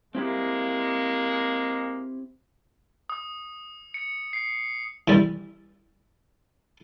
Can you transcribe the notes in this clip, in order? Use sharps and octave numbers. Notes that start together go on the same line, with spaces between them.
G#3 A#3 C4 E4 G4
D#6
C#7
C7
E3 G3